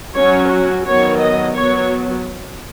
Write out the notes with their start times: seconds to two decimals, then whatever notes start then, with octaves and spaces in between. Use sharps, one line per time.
0.14 F#3 C#4 C#5
0.49 F#4
0.84 D#3 F#3 B3 C#5
1.19 D#5
1.54 F#3 B3 C#5